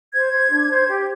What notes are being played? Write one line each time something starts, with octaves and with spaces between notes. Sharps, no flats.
C5 G#6
C5
D4
C5
G4